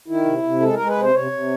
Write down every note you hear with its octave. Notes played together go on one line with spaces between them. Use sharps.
D#3 E4
C3
C3
G#3 A4
A#4
G#3
B4
C3 C5
C3 C#5
C3